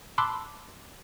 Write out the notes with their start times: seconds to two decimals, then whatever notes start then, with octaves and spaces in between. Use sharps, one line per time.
0.18 A5 B5 C6 D6 E6 F#6